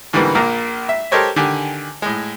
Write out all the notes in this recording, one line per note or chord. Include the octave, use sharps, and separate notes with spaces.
G#2 D3 E3 G3 A#3 B3
A#1 A#2 A#3 A#5
E5
G4 A4 A#4 C5 C#5 D#5
D3 D#3 G4 G#5
A2 G#3